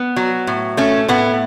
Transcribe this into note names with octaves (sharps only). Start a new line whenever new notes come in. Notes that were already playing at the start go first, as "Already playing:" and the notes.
Already playing: B3
F#3
A2
A3 C#4
A2 B3